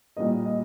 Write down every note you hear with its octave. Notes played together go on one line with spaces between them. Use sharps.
A#2 G3 A#3 D#5
D#5